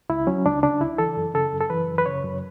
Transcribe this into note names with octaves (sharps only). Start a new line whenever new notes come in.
C#2 E4
F#3 C#4
C#2 D4
C#3 D4
C#2 E4
E3 A4
F#2
C#3 A4
F#2
A4
E3 B4
F#2
B4
C#3 C#5
F#2